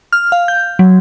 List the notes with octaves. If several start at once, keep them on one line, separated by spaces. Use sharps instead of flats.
F6
F5
G6
F#3